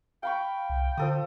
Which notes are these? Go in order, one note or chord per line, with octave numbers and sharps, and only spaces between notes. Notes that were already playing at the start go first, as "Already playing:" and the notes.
F5 G5 B5 C#6
C2
D3 F3 A4 D#6